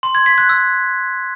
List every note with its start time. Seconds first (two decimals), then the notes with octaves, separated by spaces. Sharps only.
0.03 C6
0.15 G#6
0.26 B6
0.38 F#6
0.49 E6